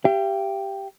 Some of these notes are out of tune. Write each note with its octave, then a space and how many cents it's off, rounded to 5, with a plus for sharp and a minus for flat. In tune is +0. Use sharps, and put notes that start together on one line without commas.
G4 +0 F5 -45